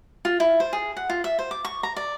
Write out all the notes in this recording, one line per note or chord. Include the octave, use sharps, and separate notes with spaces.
F4
E4
C5
G#4
F#5
F4
E5
C5
D6
C#6
A#5
D5